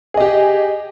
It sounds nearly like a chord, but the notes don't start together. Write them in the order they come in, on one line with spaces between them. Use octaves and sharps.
G#4 D#5 G4